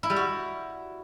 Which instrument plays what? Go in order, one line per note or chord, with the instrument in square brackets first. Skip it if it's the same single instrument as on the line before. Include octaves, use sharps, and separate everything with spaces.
[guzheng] E4
G3
F#4